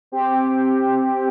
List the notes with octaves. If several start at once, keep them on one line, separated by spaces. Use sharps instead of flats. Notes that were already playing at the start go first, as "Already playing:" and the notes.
C4 G4